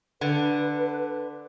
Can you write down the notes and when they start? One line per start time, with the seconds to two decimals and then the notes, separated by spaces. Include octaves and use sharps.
0.21 D3 B4